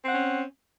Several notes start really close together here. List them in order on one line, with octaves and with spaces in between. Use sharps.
C4 F#5 C#4